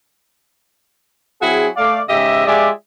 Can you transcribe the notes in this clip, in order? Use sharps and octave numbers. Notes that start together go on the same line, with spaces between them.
F#3 C4 E4 F#4 G#4
A3 D5 F5
G#2 C#3 G4 D#5 E5
G#3 F4 G4 G#4 D5 E5